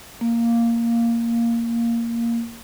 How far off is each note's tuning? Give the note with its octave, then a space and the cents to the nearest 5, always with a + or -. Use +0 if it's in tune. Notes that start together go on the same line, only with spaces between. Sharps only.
A#3 -5